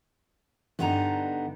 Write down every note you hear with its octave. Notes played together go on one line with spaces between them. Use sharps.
G2 D3 B3 D4 D#4 A#5